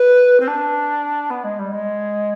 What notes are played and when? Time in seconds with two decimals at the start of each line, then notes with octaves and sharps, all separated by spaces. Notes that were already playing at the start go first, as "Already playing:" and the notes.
Already playing: B4
0.40 C4
0.47 D4
1.30 B3
1.44 G#3
1.59 G3
1.72 G#3